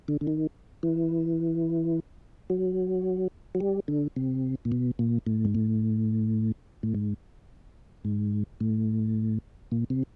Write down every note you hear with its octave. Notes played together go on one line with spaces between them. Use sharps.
D3
D3
D#3
E3
F#3
F#3
G3
D3
C3
A#2
B2
A#2
A2
G#2
A2
A2
G#2
G#2
A2
A#2
C3